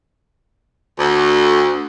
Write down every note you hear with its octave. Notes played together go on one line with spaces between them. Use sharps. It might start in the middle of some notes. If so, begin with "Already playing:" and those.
D2